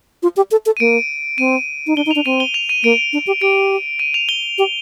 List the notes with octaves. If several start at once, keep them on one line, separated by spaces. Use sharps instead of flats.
F4
G4
A4
A4
D#7
A#3 D7
C4 D#7
D#4
D4 G7
D#4
F7
D4
C4 D#7
G7
F7
D#7
A#3 D7
D4
G4
G4 D7
D#7
F7
G7
G4